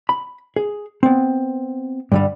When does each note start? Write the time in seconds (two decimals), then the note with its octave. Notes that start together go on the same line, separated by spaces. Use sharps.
0.09 B5
0.56 G#4
1.03 B3 C4
2.12 G2 D3 G3